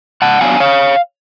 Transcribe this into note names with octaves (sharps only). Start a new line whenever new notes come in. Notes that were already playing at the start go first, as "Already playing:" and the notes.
G#2 F#5 A5
F#3 B3 D4 F5 G#5
C#5 F5